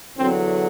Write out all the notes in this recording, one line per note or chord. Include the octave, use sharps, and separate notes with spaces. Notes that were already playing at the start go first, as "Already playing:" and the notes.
E2 D3 F#3 C4